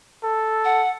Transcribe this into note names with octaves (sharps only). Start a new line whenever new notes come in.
A4
F#5